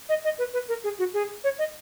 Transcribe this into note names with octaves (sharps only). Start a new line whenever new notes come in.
D#5
D#5
B4
B4
A#4
G#4
F#4
G#4
C#5
D#5